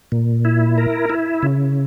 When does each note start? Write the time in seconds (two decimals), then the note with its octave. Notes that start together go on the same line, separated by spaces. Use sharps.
0.12 A#2
0.45 E4
0.78 A#4
1.10 E4
1.43 C#3